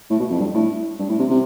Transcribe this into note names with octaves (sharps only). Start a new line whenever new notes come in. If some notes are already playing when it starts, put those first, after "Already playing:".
A2
B2
F2
G2
A2
G2
A2
C3
C3